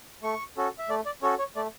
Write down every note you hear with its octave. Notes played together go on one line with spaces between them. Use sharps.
A3 C#6
C#4 F#4 A4
E5
A3 D5
D5
C#4 F#4 A4 C#5
C#5
A3 D5